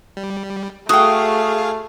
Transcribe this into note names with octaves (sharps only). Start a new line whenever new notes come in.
G3
A3 F#4 G#4 F5 G5 D#6